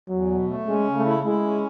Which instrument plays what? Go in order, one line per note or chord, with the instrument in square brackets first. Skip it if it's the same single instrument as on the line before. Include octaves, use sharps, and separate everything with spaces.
[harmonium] E2 [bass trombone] F#3
[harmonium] B2
A3
[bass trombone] G#3 [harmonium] C#4
[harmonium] C#3
[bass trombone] A3
[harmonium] E4
[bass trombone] G#3 [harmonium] E4
[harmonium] C#4